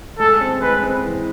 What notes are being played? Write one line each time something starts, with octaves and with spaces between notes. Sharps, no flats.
G#3 A4
C4
G#3 B4
C4
E3